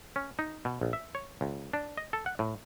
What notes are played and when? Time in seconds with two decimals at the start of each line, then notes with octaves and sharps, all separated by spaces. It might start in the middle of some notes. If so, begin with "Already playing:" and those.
0.16 C#4
0.39 D#4
0.65 B2
0.81 A#1
0.93 E5
1.15 C#5
1.41 C#2
1.73 D4
1.98 D#5
2.13 A4
2.26 F#5
2.39 A2